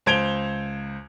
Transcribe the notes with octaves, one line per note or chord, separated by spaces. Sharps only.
C#2 C5 G#6 D7 F7 G7